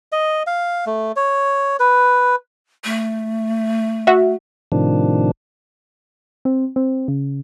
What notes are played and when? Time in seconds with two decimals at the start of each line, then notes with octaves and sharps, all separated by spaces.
0.12 D#5
0.47 F5
0.86 A3
1.16 C#5
1.80 B4
2.84 A3
4.07 F#4 E5
4.72 A2 C3 D#3 F3 D4
6.45 C4
6.76 C4
7.08 C#3